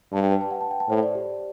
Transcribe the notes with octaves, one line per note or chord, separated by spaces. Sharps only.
G2 A5
G5
B4
A5
F#5
A5
G5
A5
A2 C5
D5
G4